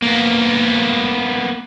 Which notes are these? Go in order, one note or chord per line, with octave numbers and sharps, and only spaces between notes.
A#3 B3